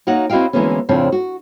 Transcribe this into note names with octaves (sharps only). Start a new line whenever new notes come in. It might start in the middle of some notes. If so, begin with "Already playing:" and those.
A#3 D#4 F#4 C#5 F#5
C4 E4 F#4 D#5 F5 G5
D2 E3 G#3 A#3 B3 C#4
F2 A2 C#3 F3 C4 D4
F#4